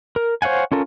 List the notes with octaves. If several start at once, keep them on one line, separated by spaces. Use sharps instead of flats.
A#4
C5 C#5 F5 F#5 G#5
C#4 F4 A4 A#4